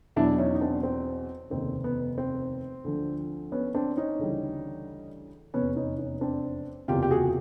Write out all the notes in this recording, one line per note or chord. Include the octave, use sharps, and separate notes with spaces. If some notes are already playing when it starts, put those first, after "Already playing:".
E2 B2 F#3 D4 E4
C#4 D#4
D#4
C4 D4
C4
F1 D#2 C#3 C4
B3
C4
D2 D3 F3
B3 C#4
C4 D4
C#4 D#4
D2 C#3 E3 G3
F1 E2 C3 B3 C#4
C#4 D#4
C#4 D#4
C4 D4
F#1 E2 C3 F4 G4
G4
F#4 G#4